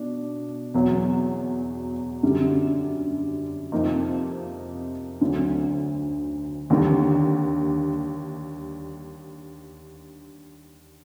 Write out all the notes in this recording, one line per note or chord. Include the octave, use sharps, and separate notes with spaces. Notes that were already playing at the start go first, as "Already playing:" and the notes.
Already playing: B2 D4
E2 B2 F#3
F#2 D3 G3
F2 C3 F3 A#3 D#4
D2 D3 F#3
D#2 D3 G3